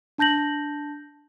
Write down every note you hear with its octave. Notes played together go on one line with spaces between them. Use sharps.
D4 A5 G6 A#6 F#7